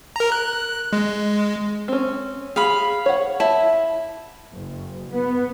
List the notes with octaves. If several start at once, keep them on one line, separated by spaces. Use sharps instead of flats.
A#4 A#5
F#6
G#3
C4 C#4
G#4 F5 B5
C#5 F#5
E4 A5
F#1
B3